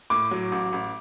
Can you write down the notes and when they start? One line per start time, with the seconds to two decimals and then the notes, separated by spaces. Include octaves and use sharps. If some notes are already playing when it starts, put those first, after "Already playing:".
0.10 A2 D6
0.31 F#3
0.52 A1
0.73 A1